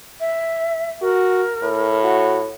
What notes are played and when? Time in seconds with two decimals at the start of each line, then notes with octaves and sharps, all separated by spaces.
0.20 E5
1.02 F#4 A#4
1.63 A2
2.02 F#4